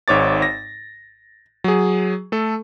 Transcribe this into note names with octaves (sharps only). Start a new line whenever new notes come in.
G#1 G#2 C#5 D6 A6
A#6
F#3 G#4
A3 A4